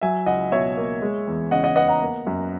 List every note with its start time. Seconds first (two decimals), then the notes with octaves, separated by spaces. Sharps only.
0.01 F#3 E5 G#5
0.26 C#2 D#5 F#5
0.52 B2 C#5 E5
0.77 A#3
1.02 G#3
1.27 E2
1.51 C#3 D#5 F#5
1.64 D#5 F#5
1.76 B3 D#5 F#5
1.88 F#5 A#5
2.02 A#3
2.27 F#2